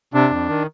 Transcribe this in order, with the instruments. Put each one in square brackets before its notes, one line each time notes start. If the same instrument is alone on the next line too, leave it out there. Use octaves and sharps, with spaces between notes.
[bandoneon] C3 D4
F2
D#3